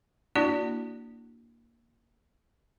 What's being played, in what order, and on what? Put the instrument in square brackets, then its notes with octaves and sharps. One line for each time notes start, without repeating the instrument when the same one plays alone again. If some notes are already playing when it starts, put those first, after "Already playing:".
[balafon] A#3 D4 E4 F#4 D5